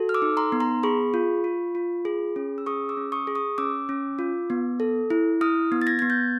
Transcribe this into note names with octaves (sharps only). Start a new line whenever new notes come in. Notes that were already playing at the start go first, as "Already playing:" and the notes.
Already playing: F#4 A4
F6
D6 E6
D#4
A#5 C6
B3
A#5 C6
G#4 B5 C#6
F4
F4
F4
G#4
C#4
E6
G#4 C#6 D#6
D6 E6
C#4
C#6 D#6
G#4
C#6 D#6
C#4 D6 E6
C#4
F4
B3
A4
E4
E4 D#6 F6
B3
A6
G#6 A#6
B3 G#6
G6 A6